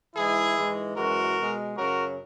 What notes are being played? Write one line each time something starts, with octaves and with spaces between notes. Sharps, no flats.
G#2 E3 G#3 E4 G#4
G#2 E3 G#3
F#2 E3 G#3 F#4 A#4
B2 G#3
F#2 C#3 F#3 F#4 A#4